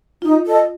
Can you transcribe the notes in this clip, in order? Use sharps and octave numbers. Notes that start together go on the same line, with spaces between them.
D#4 F4
A4 D#5